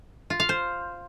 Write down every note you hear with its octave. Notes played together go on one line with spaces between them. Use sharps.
F4
F5
C5